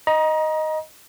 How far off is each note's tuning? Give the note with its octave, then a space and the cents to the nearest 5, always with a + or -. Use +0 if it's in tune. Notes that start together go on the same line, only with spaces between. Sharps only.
D#5 +0 A#5 +30